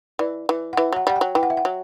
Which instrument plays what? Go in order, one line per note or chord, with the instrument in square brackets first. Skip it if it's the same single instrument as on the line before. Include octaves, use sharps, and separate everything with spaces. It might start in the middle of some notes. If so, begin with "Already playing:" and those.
[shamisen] E3 [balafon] D5
[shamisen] E3
[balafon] F#5
[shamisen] E3 [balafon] E5
[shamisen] F#3 [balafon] F#5
[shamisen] G3 [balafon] F#5
[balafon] G5
[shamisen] F#3
[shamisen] E3 [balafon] G5
[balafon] F#5
E5
F#5
[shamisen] F#3